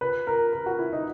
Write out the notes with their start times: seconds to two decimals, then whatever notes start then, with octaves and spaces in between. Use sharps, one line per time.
0.01 B4
0.27 A#4
0.53 A#4
0.66 F#4
0.79 E4
0.93 D#4